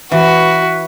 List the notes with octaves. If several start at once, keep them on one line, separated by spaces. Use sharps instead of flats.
E3 F#4 B4